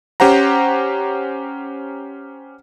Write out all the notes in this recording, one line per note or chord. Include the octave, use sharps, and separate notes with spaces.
C#4 G4 C5 F#5 A#5